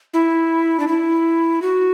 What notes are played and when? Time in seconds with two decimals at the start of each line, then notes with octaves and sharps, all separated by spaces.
0.14 E4
0.80 D4
0.88 E4
1.62 F#4